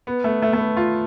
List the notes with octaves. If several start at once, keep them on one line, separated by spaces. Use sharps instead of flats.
B3
A3
A3
A3
B3
F4